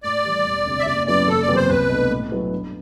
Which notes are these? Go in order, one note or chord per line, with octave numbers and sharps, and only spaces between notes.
A2 D5
E3 G3
E1
D2 C3
E5
F#1 D5
F#2 F#3 B3 E4 D5
F#1 A4
D5
E2 C3 F#3 B3
C5
C2 B4
B2 A3 D4
A2
F#3 B3 E4
G2